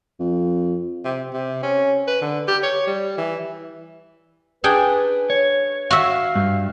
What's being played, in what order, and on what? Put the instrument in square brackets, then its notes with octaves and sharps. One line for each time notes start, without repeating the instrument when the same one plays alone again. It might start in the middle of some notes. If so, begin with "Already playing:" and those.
[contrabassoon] F2
[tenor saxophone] C3
C3
C#4
B4
D3
G4
C#5
G3
E3
[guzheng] D4 G#4 G5 [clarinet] B4
[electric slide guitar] C#5
[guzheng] F#4 E5 [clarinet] F5
[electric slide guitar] G2